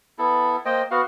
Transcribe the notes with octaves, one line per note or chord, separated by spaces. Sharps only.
B3 E4 A4
A#3 C5 D#5 G5
B3 F#4 F5